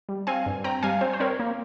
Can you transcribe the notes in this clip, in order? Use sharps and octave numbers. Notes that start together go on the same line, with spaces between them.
G3
C4 F5 G#5
G2
C4 G5 A#5
G3 F5 G#5
C4 C5
C5
C4 A#4 C#5
A#3